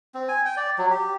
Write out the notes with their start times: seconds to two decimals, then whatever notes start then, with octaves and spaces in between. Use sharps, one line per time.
0.14 C4
0.29 G#5
0.45 G5
0.57 D5
0.78 F#3
0.91 G4